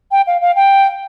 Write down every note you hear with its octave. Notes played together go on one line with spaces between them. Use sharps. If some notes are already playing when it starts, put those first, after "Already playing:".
G5
F5
F5
G5